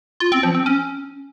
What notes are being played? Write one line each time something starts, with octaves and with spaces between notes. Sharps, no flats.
F4
C4
F3
C4
C#4